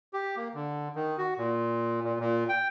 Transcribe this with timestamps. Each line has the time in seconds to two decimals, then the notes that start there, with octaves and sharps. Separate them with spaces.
0.13 G4
0.37 A#3
0.55 D3
0.95 D#3
1.18 F#4
1.38 A#2
2.03 A#2
2.20 A#2
2.49 G5